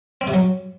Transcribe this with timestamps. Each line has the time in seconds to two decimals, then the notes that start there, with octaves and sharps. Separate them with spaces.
0.21 C4
0.27 C3
0.34 F#3